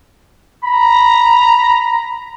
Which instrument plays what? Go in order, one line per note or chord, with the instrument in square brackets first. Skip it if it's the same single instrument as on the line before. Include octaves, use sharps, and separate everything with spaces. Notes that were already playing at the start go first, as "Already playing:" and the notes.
[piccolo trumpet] A#5 [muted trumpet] B5